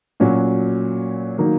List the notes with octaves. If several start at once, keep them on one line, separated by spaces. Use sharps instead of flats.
A#2 F#3 C#4 F#4
D#3 F#3 A#3 D#4